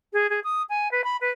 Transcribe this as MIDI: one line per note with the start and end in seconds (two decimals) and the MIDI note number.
0.13 0.29 68
0.29 0.40 68
0.44 0.62 87
0.69 0.90 80
0.91 1.04 71
1.04 1.16 83
1.21 1.30 71